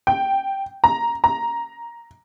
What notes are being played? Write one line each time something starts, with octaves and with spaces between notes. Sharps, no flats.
G5
A#5
A#5